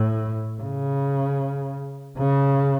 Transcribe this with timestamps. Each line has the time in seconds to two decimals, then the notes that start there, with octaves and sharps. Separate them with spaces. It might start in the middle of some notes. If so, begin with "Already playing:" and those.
Already playing: A2
0.62 C#3
2.18 C#3